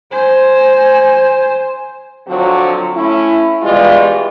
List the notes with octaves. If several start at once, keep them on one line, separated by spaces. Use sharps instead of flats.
C5 G#5
D3 F3 F#3 C4 F#4
A3 C#4 E4
B2 E3 G3 G#3 F4